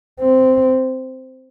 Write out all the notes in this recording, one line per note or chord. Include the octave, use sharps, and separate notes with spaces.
C4